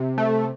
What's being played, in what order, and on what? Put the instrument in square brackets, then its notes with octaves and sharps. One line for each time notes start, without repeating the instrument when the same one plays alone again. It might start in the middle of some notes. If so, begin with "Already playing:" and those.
Already playing: [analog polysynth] C3
A3